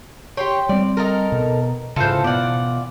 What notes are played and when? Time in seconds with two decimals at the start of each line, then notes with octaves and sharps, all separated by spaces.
0.37 G4 C#5 G5 C6
0.69 G3 G#3 C4 D5
0.97 D#4 A4 A#4
1.32 B2
1.96 G#2 C#3 E3 F4 A4 C5 F5
2.24 B2 B3 D5 F#5